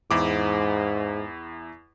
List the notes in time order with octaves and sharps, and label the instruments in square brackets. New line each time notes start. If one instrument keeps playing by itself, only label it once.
[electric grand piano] E2 E4 D6 [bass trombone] G#2